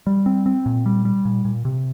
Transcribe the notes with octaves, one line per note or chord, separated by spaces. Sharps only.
G3
C4
C4
A#2
G3
G3
A#2
A#2
C3